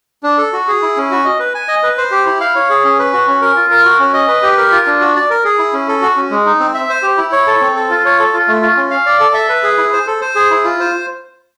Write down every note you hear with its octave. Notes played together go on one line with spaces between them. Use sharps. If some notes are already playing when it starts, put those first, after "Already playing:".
D4
A4
F#4
G#4
E4
C#4
F#4
D#5
B4
G#5
D#5
B4
C5
G4
E4
F5
C#5
G#4
C#4
B4
F#4
C#4
A#4
F4
A#4
F#4
C#4
D#5
B4
G4
A#4
F4
D4
F#4
D5
A#4
G#4
E4
C#4
A4
F#4
C#4
G#3
D#4
C4
E5
C5
G4
E4
C#5
A4
C4
A4
F4
C#5
A4
F4
A3
F4
C#4
F5
D5
A4
E5
B4
G#4
E4
C5
A4
C5
G#4
E4
F4
C5